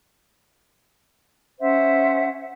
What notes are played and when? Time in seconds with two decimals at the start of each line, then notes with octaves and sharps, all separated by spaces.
1.60 C#4 C5 E5 F#5